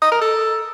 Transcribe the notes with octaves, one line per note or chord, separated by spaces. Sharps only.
D#5
A#4
A4